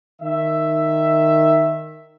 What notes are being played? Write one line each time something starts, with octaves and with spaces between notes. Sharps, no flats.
D#3 E5